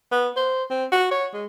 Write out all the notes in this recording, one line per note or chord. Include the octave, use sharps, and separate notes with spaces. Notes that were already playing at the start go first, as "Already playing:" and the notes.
B3
C5
C4
F#4
C#5
G#3